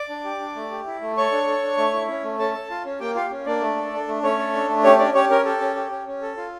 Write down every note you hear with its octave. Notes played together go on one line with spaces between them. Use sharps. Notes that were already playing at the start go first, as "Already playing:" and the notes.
Already playing: D5 D6
D4
G4
D4
A3
G4
E4
A3
A4 C#5 C#6
D4
A4
D4
A3
E4
C#4
A3
C#4 A4 A5
A4
F4
C#4
A#3 G4 G5
F4 G4 F5
C#4
A#3 D4 D5
A3
A4
D4
A3
A3 C#4 C#5
A4
D4
A3
C#4 G4 C#5
C#4 D4 D5
C#4 G4 C#5
C#4 A#4
G4 A4
C#4
G4
C#4
C#4
A4
F4